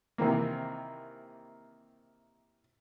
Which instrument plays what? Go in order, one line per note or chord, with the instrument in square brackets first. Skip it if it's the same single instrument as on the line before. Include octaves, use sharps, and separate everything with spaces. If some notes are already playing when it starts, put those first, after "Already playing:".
[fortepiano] C3 D#3 E3 A#3